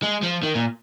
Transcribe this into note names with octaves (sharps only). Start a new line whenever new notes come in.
G#3
F3
D#3
A#2